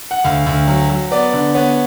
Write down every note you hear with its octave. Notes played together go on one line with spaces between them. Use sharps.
F#5
D2 F5
D2
F#3
F#3
B3 D5
D3
B3 C#5